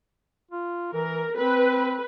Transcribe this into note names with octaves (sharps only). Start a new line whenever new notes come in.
F4
E3 A#4
C4 B4